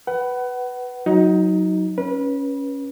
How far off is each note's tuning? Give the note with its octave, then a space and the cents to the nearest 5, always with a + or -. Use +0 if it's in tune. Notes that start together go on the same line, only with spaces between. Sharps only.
B4 +0 F#5 +30
F#3 +0 D#4 +20
C#4 +0 B4 -30